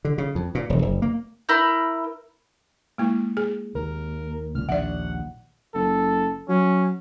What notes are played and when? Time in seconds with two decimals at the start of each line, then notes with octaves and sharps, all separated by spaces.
0.05 D3
0.18 C#3
0.35 F2
0.55 A#2
0.70 E1
0.82 F#1
1.02 A#3
1.49 E4 A#4 B5 G6
2.98 G#3 A#3 E4
3.37 G#4
3.75 D#2 A#4
4.55 C#2 A#2 F6
4.69 A#1 D#2 D5 E5 F#5
5.75 F#1 A4
6.49 F#3 C#4